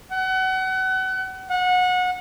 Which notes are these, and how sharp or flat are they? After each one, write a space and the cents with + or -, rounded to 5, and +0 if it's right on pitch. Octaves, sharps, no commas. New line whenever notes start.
F#5 +30
F#5 -25